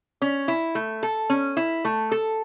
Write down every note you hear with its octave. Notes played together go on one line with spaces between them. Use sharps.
C#4
E4
A3
A4
C#4
E4
A3
A4